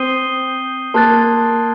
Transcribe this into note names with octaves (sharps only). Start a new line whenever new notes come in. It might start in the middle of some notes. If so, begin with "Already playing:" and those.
Already playing: C4 D#6 G6 C7 D#7 G7
A#3 A5 C6 F#6 A6